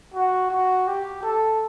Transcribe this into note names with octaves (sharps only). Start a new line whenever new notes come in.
F#4
F#4
G4
A4